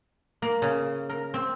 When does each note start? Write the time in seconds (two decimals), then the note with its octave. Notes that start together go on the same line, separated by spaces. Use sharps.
0.42 A#3
0.62 C#3
1.09 A#4
1.34 C4